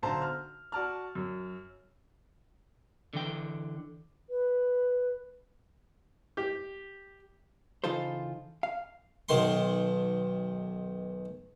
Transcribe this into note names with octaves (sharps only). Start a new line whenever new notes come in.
B1 D3 C5 A5 A#5
F6
F#4 D5 A5 F6
F#2
D3 E3 G5
B4
G4
C#3 E3 D#4 F4 A4 C5
F5
B1 D#3 C6